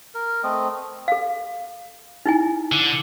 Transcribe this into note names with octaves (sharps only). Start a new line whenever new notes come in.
A#4
A3 C4 D#5
A4 F5
D#4 E4 G#5
D3